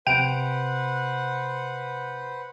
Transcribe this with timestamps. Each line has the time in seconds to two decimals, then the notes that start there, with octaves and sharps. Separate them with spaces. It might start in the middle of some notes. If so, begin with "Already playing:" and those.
0.07 C3 B4 C5 F#5 G5 D7 F7